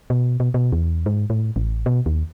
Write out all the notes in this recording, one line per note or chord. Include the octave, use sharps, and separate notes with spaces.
B2
B2
B2
E2
G#2
A2
A1
B2
D#2